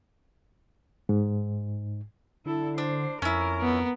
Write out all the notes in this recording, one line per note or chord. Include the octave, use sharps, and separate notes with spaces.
G#2
D3 E4 A4
D4 C5
F2 C#4 E4 A#4
B3